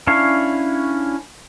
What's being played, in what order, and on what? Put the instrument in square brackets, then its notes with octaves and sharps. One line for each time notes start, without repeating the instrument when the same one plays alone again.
[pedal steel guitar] C#4 D4 E4 C#5 F5